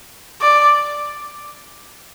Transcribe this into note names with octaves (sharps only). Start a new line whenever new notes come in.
D5